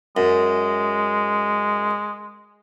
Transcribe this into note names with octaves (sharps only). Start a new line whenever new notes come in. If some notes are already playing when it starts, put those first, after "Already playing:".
F#2 G#3